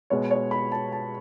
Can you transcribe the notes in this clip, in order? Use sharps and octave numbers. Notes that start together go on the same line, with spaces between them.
B2 G#3 B3 C#5
C#5
B5
A5
A5